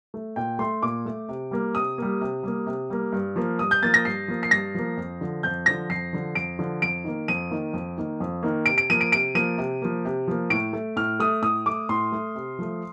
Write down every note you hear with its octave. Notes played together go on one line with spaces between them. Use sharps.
A3
A#2 G5
A3 C6
A#2 D6
A3
C3
G3 A#3
C3 D#6
G3 A#3
C3
G3 A#3
C3
G3 A#3
G2
F3 A#3
G2 D#6
G6
F3 A#3 A6
A#6
G2 C7
F3 A#3
C7
G2 A#6
F3 A#3
F2
D3 F3
F2 G6
D3 F3 A#6
F2 C7
D3 F3
F2 D7
D3 F3
F2 D7
D#3 A#3
F2 D#7
D#3 A#3
F2
D#3 A#3
F2
D#3 A#3
C3 D7
D7
F3 A#3 D#7
D7
C3 D7
F3 A#3 D#7
C3
F3 A#3
C3
F3 A#3
A2 D7
A3
A2 F6
A3 D#6
A2 D#6
A3 D6
A2 C6
A3
C3
F3 A3